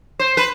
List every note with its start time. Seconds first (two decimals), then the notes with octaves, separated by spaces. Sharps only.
0.19 C5
0.37 B4